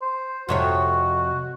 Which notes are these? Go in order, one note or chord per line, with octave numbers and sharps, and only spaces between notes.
C5
F2 C3 F#4 C#5